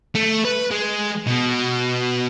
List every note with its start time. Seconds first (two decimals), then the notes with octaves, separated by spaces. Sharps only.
0.15 A3
0.45 B4
0.71 G#3
1.27 B2